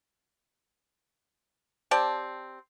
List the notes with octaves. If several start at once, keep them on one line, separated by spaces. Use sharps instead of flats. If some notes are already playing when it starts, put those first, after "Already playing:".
C4 G4 D5 A5